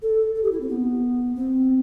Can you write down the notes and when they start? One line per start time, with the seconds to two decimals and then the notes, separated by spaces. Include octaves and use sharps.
0.02 A4
0.35 A4
0.43 G4
0.52 E4
0.60 C4
0.69 B3
1.35 C4